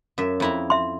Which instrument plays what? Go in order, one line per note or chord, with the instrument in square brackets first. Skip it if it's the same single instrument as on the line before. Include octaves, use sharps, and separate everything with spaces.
[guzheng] F#2 E5
F2 E4 A#5
[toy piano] E5 C6